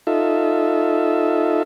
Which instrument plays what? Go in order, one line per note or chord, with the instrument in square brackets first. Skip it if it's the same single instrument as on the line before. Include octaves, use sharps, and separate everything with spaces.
[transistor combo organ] D#4 F4 A4 E5